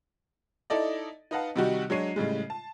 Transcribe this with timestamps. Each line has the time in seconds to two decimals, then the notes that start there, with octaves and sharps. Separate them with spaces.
0.70 D#4 E4 A4 D5 D#5
1.31 D#4 B4 D#5 F5 F#5 A5
1.56 C3 D#3 G3 D#4 F#4 G4
1.90 F#3 G#3 D4 C#5 C7 D#7
2.16 A2 C#3 G3 G#3
2.50 A5